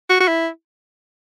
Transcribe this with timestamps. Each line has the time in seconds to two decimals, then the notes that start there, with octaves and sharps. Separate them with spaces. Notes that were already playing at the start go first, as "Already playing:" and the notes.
0.09 F#4
0.20 F#4
0.28 E4